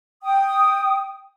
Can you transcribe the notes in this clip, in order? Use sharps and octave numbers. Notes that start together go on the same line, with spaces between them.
G5 D#6